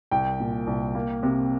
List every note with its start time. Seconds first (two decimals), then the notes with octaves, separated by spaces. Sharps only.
0.11 C2 G5
0.40 A#2
0.67 C2
0.95 A#3
1.23 C3